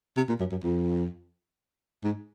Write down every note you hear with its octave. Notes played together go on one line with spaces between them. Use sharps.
C3
A#2
F#2
F#2
F2
G#2